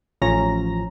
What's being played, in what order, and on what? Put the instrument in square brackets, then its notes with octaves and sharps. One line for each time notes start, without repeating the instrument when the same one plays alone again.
[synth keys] A1 F3 C#4 A#5 A#6